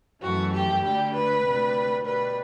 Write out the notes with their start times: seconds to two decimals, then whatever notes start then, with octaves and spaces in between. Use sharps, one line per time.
0.21 F#2 E3 A3 F#4
0.51 G4
0.82 D2 D3 G3 G4
1.13 B4
1.43 D2 C3 G3
2.04 B2 G3 B4